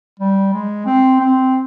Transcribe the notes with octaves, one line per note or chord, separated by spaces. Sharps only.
G3
G#3
C4
C4